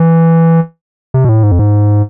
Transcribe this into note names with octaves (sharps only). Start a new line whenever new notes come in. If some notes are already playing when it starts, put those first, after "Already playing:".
Already playing: E3
C3
B2
A2
G#2
F2
G#2